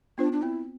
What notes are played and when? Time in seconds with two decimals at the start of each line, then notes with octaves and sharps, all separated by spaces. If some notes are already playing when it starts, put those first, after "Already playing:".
0.18 B3 D4 F4 C5
0.32 D4
0.42 C4 E4